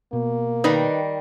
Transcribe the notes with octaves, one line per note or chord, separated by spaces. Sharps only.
B2 A#3
D#3 G3 D#4 B4